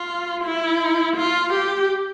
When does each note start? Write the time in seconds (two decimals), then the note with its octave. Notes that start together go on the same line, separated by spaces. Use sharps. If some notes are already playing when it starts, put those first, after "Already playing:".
Already playing: F4
0.44 E4
1.16 F4
1.53 G4